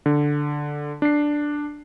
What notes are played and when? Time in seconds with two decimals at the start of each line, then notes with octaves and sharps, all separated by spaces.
0.06 D3
1.02 D4 C7